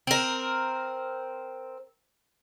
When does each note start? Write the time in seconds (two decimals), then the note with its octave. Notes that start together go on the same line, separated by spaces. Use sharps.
0.07 C4 A#4